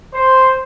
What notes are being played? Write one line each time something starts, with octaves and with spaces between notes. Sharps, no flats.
C5